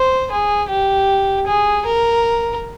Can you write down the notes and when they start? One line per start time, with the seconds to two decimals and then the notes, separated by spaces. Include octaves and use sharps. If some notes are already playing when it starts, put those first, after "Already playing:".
Already playing: C5
0.31 G#4
0.69 G4
1.47 G#4
1.86 A#4